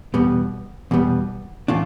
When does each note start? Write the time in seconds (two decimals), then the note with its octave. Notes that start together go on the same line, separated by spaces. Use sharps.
0.14 E2 B2 G3 B3
0.91 E2 B2 G3 B3
1.68 A2 E3 A3 D4 F4